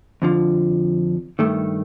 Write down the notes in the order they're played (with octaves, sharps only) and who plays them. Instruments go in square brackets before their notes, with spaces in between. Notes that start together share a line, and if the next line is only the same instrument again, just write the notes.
[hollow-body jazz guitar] F2 D3 F3
G2 D#3 A3